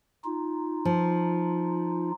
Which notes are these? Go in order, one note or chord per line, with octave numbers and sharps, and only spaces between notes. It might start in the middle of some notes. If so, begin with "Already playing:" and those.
D#4 F4
F3